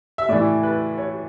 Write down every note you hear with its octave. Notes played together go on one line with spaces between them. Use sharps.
E5
A2 E3 D5
B4
C#5